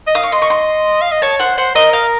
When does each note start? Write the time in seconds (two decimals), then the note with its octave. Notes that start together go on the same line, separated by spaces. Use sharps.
0.07 D#5
0.15 F5 D#6
0.23 C#6
0.32 D#5 C6
0.42 C#6
0.50 C6
1.01 F5
1.12 D#5
1.22 C#5 A5
1.40 C5 F#5
1.58 C5 F#5
1.75 A#4 D#5
1.93 F5